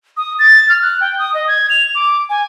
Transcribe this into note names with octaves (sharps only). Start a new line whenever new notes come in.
D#6
A6
F6
F#6
G5
D#6
D#5
G#6
F7
D6
G#5